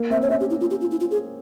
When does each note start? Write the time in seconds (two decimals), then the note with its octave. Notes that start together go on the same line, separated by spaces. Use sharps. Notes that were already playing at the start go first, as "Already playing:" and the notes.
Already playing: A#3
0.10 C4 E5
0.22 C#5
0.30 C#4 E5
0.40 G4
0.50 E4
0.60 F4
0.71 G4
0.81 F4
0.91 E4
1.00 F4
1.11 G#4